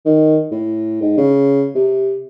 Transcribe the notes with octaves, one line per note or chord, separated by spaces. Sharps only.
D#3
A2
G#2
C#3
C3